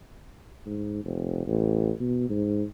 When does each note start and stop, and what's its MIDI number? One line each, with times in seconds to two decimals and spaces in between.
0.66 1.04 44
1.04 1.47 29
1.47 1.91 33
2.00 2.28 47
2.30 2.63 44